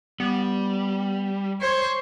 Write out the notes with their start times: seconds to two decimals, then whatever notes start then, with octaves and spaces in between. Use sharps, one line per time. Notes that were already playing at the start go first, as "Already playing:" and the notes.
0.20 G3 B3
1.61 C5 C#5